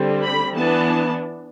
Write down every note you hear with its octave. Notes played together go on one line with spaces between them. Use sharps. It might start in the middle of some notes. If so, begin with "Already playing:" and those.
Already playing: D3 G3 C4
B5
E3 B3 D4 A5